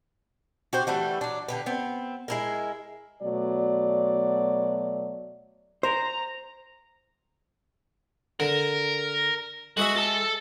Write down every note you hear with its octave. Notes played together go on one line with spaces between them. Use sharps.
F#4 G4 C5
E3 G3 A3 F#4
F#3 D4
D3 G4 B4
B3 C4
G#3 E4 A#4
B2 F#3 A3 D5
C5 A#5
D3 A#4
G#3 F#4 G#4 E5
A4 A5